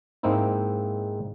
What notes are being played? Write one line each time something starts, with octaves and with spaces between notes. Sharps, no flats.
G#2 G#3 A#3 C4 D#4 E4